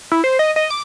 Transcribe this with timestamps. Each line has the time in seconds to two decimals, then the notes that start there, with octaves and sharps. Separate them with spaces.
0.12 E4
0.24 C5
0.39 D#5
0.56 D#5
0.70 D6